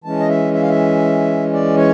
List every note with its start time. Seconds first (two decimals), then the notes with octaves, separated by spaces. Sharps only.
0.04 E3 G#3 C#4 A5
0.19 D#5
0.29 E5
0.54 E5
0.62 F5
0.69 E5
1.53 D5
1.77 C#5